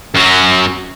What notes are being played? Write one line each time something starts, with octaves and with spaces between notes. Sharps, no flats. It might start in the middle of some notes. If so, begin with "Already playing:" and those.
F#2 F#3